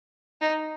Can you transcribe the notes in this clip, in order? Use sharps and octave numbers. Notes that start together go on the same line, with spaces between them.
D#4